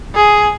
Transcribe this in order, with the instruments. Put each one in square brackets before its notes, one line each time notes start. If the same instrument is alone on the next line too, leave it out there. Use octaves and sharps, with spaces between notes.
[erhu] G#4